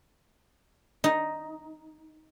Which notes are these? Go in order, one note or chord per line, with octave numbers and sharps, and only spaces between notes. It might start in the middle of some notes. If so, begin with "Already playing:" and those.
D#4